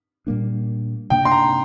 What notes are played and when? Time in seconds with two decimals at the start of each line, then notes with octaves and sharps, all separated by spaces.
0.27 A#2 G3 A#3 D4
1.10 C3 A#3 D4 G5
1.25 C6
1.32 A#5